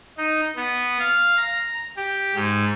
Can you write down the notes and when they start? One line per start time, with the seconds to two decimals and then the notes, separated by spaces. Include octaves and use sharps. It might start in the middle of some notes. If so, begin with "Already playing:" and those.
0.17 D#4
0.56 B3
0.99 F5
1.37 A#5
1.97 G4
2.35 G#2